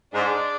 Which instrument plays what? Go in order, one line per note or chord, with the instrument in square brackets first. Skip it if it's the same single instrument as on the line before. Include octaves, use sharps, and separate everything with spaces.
[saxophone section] G#2 [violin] D4